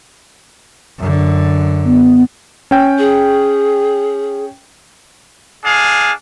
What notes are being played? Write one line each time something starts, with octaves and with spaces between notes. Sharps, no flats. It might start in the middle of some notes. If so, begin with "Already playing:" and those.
F#2 D3
B3
C#4 G5
G#4
D4 G#4 F5